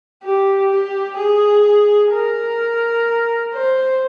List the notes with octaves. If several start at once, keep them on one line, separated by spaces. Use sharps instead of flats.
G4
G4
G#4
A#4
C5